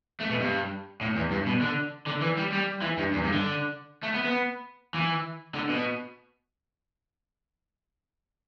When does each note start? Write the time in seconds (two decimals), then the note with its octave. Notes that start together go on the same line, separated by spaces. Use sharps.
0.20 A3
0.30 B2
0.40 G2
1.01 A2
1.16 E2
1.31 G2
1.46 B2
1.61 D3
2.06 D3
2.21 E3
2.37 G3
2.52 G3
2.82 E3
2.98 G2
3.13 E2
3.23 G2
3.33 D3
4.03 A3
4.14 B3
4.24 B3
4.94 E3
5.55 D3
5.69 B2